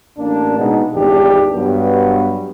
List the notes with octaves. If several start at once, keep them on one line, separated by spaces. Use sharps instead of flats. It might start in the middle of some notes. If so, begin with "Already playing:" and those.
A1 A#3 D4
B2 G#3 B3 D#4
G#1 E2 D4 G4
G2 F#3 B3